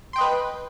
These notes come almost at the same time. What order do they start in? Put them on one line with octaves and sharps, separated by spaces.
C6 G5 D#5 B4